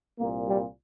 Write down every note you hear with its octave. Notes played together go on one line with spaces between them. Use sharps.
C2 A#2 A#3
G3